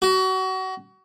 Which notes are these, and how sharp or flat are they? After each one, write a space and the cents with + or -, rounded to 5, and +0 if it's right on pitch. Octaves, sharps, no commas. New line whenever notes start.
F#4 +30